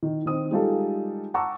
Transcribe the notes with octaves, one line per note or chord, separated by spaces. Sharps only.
D#3
D#3 C4 D#6
G3 G#3 D#4 F4 G4 A4
F#5 A5 A#5 C#6 D6 E6